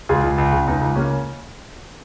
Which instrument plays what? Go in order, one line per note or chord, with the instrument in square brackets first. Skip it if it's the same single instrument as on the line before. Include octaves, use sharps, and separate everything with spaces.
[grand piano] C#2 F4 G#4
C#2
C#2
C#3
C#2 B3 D#4
C#2
C#3 A#3 C#4